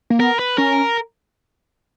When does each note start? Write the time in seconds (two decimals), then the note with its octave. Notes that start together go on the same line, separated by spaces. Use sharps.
0.10 A#3
0.20 B3 A#4
0.39 B4
0.58 C#4 A#4